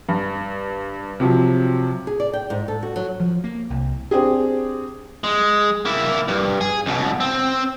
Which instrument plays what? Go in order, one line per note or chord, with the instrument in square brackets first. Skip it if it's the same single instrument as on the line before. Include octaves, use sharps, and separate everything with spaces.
[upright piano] G2
C3 F3 F#3
[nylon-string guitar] G#4
D5
G5
G#2
A4
F#4
F#3
[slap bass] F3
A#3
C2
[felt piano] C4 D4 G4 G#4
[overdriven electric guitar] G#3
A#3 E4
G2
G#4
C#2 B2
C4